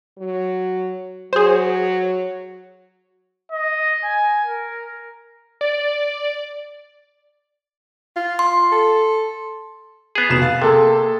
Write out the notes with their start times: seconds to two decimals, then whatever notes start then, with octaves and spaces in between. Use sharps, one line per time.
0.18 F#3
1.33 F#3 G#4 C5
3.52 D#5
4.03 G#5
4.45 A#4
5.61 D5
8.16 F4
8.39 C6
8.72 A4
10.15 B3 G#4
10.29 F1 B2 E7
10.42 F5 A6
10.62 C3 A#3 G#4 A4 A5